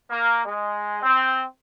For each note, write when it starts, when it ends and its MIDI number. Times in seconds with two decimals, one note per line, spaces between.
0.10 0.45 58
0.45 0.99 56
1.03 1.41 60